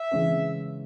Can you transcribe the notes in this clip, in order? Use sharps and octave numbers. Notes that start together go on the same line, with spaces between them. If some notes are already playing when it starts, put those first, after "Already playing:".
Already playing: E5
C#3 E3 G#3 C#4